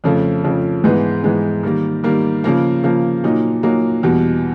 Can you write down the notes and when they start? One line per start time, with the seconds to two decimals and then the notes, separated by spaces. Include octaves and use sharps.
0.04 F2 C#3 F3 A3
0.44 F2 C#3 F3 A3
0.84 G#2 E3 G#3 B3
1.24 G#2 E3 G#3 B3
1.63 D#3 G3 A#3
2.04 D#3 G3 A#3
2.44 C#3 F3 A#3
2.84 C#3 F3 A#3
3.24 A#2 F#3 A#3 D#4
3.63 A#2 F#3 A#3 D#4
4.03 E2 B2 G3